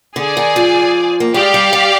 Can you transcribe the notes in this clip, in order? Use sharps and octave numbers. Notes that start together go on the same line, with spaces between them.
D3 G#4 D5 G#5
D#3
F3
A#3
G#3 G4 D5 F5
G3
G3